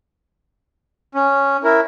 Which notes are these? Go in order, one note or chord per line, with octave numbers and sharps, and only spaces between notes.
C#4
E4 A#4